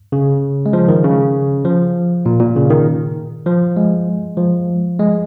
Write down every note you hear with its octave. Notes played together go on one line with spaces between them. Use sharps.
C#3
G#3
F3
D#3
C#3
F3
A#2
A#2
C#3
D#3
F3
G#3
F3
G#3